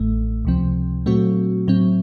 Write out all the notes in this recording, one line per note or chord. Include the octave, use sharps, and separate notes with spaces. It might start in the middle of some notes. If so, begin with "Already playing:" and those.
Already playing: A1 A2 A3
C#2 C3 F3 C4
A#2 F#3 A3 C4 F#4
A2 F#3 C4